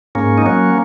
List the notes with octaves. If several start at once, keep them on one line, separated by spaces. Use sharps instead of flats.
G#2 A#3 C#4
D#4
F#3 A#3 C#4